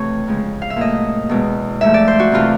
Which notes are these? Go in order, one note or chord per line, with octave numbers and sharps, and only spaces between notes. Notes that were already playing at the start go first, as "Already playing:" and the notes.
Already playing: F2 C3 E3 A3 C#5
F2 C#3 F3 G#3
F5
E5
A#2 F#3 A3 D#5
E2 B2 G#3
G#2 F3 A3 E5
D5
C5
F#4
C3 E3 A3 F4